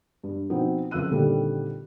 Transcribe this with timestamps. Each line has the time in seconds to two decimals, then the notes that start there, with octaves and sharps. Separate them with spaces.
0.23 G2
0.50 B2 F3 B3 C4 D#4
0.91 F#1 F2 F4 E6 F#6 D#7
1.11 A#2 D3 D#3 G3 C4 A4